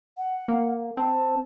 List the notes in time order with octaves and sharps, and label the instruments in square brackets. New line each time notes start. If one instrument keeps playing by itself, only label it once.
[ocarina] F#5
[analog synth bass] A#3
[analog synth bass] C4 [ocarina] A5